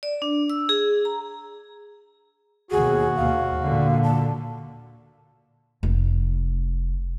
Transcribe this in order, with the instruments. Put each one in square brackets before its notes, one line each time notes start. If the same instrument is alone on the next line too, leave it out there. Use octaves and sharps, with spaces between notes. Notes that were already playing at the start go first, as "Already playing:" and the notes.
[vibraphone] D5
D4
E6
G#4
A#5
[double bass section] D#2 B2 [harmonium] F#4 [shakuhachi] G#4
[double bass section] D#2 [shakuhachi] F5
[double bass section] A#2 D3
[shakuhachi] A5
[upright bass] F1